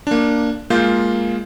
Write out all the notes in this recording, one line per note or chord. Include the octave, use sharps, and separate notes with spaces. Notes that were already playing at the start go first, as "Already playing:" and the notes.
A#3 D4
G#3 A#3 F4 G6